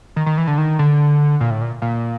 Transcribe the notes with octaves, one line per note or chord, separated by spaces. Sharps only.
D#3
D#3
E3
D3
D#3
D3
A#2
A2
A#2
A#2